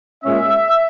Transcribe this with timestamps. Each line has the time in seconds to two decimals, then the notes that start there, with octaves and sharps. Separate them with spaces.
0.24 A#2 G#3 C#4 E5